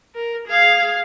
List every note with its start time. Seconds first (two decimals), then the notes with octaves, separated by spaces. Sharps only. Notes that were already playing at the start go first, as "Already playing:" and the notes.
0.15 A#4
0.47 G#4 F5